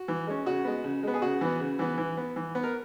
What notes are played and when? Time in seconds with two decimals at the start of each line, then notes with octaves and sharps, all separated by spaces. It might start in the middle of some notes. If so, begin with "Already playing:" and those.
Already playing: F#4
0.08 E3
0.27 G#3 C#4
0.46 C#3 F#4
0.65 G#3 B3
0.84 C#3
1.03 G#3 B3
1.14 G#4
1.22 C#3 F#4
1.41 E3 B3
1.60 C#3
1.79 E3 B3
1.98 E3
2.17 B3
2.36 E3
2.55 B3
2.63 A#4